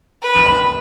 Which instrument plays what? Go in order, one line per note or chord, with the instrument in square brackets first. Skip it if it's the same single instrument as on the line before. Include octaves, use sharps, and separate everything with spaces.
[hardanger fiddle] B4
[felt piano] B5